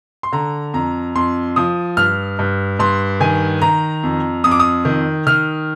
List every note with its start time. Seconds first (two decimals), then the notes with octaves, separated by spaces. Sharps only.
0.23 C6
0.32 D3 A#5
0.74 F2 A#5
1.15 F2 C6
1.56 F3 D#6
1.97 G2 F6
2.39 G2
2.79 G2 C6
3.20 D#3 G#5
3.62 D#3 A#5
4.03 F2
4.44 F2 D#6
4.51 D6
4.60 D#6
4.85 D#3
5.27 D#3 F6